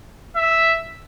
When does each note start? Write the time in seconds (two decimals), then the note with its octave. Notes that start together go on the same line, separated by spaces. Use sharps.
0.36 E5